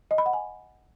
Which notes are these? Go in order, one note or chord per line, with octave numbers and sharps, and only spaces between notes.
D#5
B5
F#5
G#5